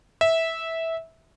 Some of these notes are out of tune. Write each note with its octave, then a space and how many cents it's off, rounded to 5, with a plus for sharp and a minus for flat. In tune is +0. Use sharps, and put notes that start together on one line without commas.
E5 -15